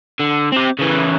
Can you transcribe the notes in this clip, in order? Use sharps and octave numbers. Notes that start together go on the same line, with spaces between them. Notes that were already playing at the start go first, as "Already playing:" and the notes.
D3
C4 G4
C#3 E3